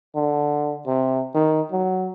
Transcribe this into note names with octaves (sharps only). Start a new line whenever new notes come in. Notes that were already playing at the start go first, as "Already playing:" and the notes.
D3
C3
D#3
F#3